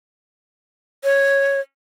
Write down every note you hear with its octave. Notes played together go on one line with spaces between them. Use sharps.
C#5